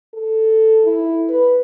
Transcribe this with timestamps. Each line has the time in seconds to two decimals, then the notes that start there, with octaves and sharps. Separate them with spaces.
0.14 A4
0.84 E4
1.30 B4